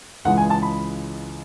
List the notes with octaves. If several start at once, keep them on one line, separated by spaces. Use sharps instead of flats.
C#2 C#3 E3 G#3 F#5
G#5
A5
B5